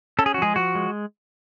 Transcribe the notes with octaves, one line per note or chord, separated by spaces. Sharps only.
C#4 A4
G#4
F#4
F3 G#3 G#4
F3 F#4
G#3